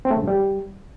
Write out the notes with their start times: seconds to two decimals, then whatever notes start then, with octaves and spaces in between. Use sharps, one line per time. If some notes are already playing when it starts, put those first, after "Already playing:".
0.05 C4
0.11 A3
0.16 C#3
0.22 G2
0.28 G3